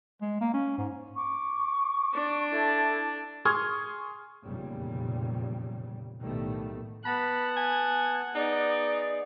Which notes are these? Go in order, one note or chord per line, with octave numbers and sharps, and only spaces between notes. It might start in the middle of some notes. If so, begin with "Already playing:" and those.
G#3
A#3
C#4
G#2
C#6 D6
D4 D5
E4 A4 G#6
G#4 C6 C#6 D#6 F6 G#6
F1 E2 A#2 C#3 G3
B1 A2 D#3 G3 A3 B3
B3 F#5 A5 B5
G#5
B3 D#4 G#4 D5